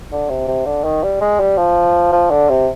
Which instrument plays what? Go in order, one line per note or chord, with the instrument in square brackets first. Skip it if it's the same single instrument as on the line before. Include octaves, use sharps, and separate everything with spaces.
[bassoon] D3
C3
C3
D3
D#3
G3
G#3
G3
F3
F3
D3
C3